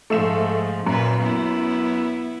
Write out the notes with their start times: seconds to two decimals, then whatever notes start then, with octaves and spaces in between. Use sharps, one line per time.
0.10 G#2 F3 A3 E5 E7
0.87 F#2 A#2 B4
1.21 B3 E4